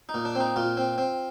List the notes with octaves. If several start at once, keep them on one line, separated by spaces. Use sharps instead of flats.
D#4
A#2
D4
C4 D#4
A#2 F4
C4
C4